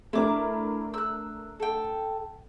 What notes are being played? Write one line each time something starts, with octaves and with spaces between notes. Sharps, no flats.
A3 D4 E4 A#4 D6
E6 F#6
A4 G5